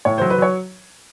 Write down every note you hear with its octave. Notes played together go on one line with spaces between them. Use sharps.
A2 C#5
F#3 C5
B4
F#3 C#5